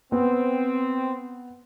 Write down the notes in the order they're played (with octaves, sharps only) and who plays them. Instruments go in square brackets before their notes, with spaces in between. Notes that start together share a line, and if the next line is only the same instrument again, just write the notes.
[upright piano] B3 [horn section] C4